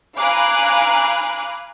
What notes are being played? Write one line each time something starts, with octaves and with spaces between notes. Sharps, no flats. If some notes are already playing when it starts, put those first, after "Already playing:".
F5 G#5 A#5 B5 D6 F#6